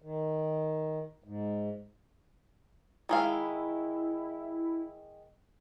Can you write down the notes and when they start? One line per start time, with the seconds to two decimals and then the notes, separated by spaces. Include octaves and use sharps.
0.02 D#3
1.24 G#2
3.09 D#3 G#3 E4 F5